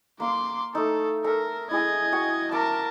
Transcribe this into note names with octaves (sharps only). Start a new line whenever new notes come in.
A#3 F5 C6 D6
A3 D#4 A4
A4 A#4 E5
E4 G#4 D#5 G#5 G#6
F#4 G5 C#6
A#4 E5 A5 B5 D6